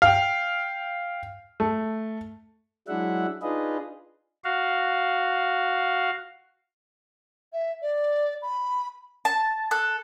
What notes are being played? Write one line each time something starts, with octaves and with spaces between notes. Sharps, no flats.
F5 G5
A3
F#3 G#3 D4 E4 E5 F#5
D4 D#4 F4 G#4 B4 D#5
F#4 F5
E5
D5
B5
A5
A4 F#6